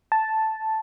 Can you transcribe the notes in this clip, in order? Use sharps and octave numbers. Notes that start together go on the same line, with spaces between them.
A5